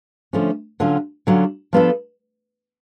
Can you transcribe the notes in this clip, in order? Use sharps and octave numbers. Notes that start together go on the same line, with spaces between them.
D3 F3 A3 C#4
D3 F#3 C#4 F4
D3 F#3 C#4 F4
F3 B3 D4 F4 A4